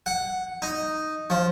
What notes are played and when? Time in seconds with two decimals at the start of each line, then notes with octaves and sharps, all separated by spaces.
0.06 F#5
0.62 D#4
1.30 F3